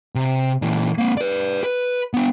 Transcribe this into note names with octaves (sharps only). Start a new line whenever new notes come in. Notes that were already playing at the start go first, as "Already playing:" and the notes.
C3
A#2 E3
A#3 C4
B4 D5
B4
B3 D4